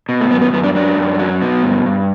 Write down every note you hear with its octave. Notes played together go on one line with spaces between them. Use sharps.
B2
A3
F#2 B3
B3
F#2 B3
D4
F#3 D4
F#2
F#3
B2
G2
G2